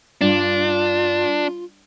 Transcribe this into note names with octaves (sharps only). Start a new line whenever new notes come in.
G2 D4 F4